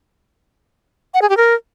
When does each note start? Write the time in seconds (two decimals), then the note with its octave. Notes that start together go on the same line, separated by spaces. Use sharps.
1.14 F#5
1.22 G#4
1.29 G4
1.37 A#4